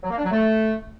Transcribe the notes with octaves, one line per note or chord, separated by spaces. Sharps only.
F#3
A#3
D4
F#3
A3